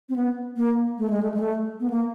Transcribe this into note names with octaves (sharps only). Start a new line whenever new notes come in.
C4
B3
A#3
A3
G#3
A3
G#3
A3
B3
A#3